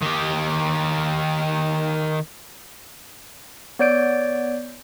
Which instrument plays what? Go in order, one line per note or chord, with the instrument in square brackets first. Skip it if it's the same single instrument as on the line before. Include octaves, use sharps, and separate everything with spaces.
[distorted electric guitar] D#3 G4
[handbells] B3 C#5 D5 G6 D7